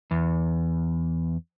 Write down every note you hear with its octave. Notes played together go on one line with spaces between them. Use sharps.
E2